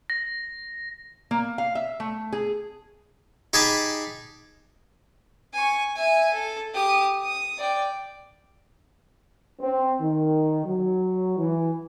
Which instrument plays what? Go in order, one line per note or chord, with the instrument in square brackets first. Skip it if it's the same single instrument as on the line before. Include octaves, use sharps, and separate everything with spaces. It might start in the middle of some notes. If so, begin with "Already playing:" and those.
[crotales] A#6
[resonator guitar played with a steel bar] A#3
F5
E5
A3
G#4
[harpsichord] D#4 G4 G#4 G#5 A5 B5
[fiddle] G#5 C#6
E5 G#5
A4
G4 D#6
D#6
D5 G5
[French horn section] C4
D#3
F#3
E3